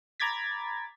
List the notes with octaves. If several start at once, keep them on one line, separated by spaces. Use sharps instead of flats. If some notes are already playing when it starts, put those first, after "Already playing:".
A#5 B5 D6 G#6 A6 B6